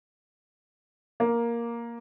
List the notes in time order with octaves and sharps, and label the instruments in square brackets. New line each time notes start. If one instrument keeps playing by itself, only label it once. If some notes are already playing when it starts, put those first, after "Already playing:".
[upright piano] A#3